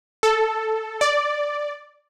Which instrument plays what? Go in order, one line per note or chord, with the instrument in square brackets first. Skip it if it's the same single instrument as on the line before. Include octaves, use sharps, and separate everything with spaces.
[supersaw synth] A4
D5